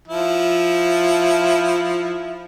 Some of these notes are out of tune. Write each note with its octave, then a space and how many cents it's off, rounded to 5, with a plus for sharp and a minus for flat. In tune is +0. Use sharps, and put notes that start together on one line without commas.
F3 +0 E4 +0